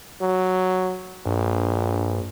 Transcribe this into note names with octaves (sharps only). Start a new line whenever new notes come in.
F#3
A#1 G2